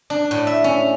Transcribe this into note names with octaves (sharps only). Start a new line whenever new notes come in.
D4
A2
E5
C#4